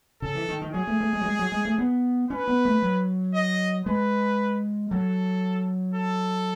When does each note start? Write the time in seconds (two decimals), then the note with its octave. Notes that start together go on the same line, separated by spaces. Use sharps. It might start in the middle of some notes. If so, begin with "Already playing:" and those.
0.22 C#3 A4
0.35 E3
0.48 D#3
0.62 D#3
0.74 F#3 G#4
0.87 A3
1.01 A3
1.13 G#3
1.21 F#3
1.26 G#3
1.39 F#3
1.52 G#3
1.65 A3
1.78 B3
2.30 C#4 B4
2.48 B3
2.65 A3
2.83 F#3
3.34 D#5
3.86 G#3 B4
4.91 F#3 A4
5.94 A4